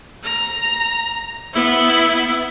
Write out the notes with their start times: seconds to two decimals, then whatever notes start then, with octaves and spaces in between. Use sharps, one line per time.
0.23 A#5
1.53 B3 E4